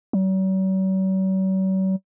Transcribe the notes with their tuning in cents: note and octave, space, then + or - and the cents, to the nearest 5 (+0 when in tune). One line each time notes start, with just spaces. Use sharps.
F#3 +45